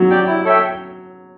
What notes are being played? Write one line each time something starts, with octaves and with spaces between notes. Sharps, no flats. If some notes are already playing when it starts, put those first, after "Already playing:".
Already playing: F#3
G4 D5 G5
E4
A4 C#5 E5 G5